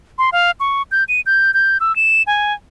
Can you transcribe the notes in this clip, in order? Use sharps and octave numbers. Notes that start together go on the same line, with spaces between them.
C6
F5
C#6
G6
D#7
G6
G6
E6
E7
G#5